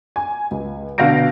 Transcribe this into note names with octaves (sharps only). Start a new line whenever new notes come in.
G#5
C#2
B2 D3 F5 G6 A#6 D7